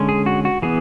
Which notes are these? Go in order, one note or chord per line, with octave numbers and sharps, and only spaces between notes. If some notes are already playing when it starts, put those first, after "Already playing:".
Already playing: D3 G#3 C#4
G#4
F#4
F#4
E3 B3 G#4